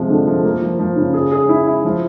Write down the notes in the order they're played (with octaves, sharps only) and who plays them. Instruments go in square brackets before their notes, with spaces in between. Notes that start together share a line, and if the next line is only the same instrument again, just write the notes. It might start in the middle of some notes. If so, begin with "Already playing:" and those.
Already playing: [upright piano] C3 F3 G#3
D3
F3
A#3
F3
F3
C#3
G#4
G#4
E4
E4
F3